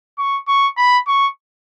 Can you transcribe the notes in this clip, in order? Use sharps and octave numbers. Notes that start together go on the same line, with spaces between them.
C#6
C#6
B5
C#6